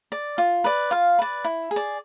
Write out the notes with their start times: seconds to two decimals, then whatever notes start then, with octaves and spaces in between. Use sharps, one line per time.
0.12 D5
0.38 F4
0.64 B4 D5
0.91 F4 F5
1.19 B4 D5
1.44 E4
1.71 G#4
1.76 D5